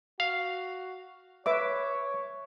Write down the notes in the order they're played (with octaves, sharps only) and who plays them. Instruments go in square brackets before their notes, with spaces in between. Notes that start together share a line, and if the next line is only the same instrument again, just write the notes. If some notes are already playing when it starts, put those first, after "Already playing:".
[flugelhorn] F#4 [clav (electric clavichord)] F5
[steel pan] B4 E5 D6 [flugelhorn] C#5